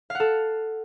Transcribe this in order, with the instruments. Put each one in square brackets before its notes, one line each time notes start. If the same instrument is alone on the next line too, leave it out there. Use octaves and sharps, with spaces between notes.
[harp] F5
F#5
A4